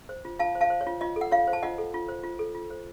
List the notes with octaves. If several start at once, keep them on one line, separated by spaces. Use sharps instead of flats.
C5
F4
F4 F5 A5
C5
F5 A5
C5
C#5
F4
F4 D#5
A4
F#5
F4 C#5 F5
C5
A5
F4 D#5 F#5
A4
F4
C5
F4
A4
F4
C5